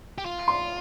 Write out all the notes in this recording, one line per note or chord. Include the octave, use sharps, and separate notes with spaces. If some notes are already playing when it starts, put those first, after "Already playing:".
G4
F4
C6